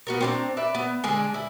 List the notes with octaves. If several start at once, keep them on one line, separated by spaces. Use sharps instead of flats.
B3 F#4 A#4
C4 D4 A#5
B4 D5 E5
B3
D3 G#3 D4 G#4
E4